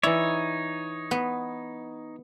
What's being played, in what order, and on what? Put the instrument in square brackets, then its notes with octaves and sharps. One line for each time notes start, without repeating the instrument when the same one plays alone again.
[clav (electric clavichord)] E3 D5 [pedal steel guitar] D#4 C#5 [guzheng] E4
[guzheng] B3